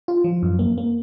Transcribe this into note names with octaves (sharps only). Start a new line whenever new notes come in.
F4
F3
F#2
A#3
A#3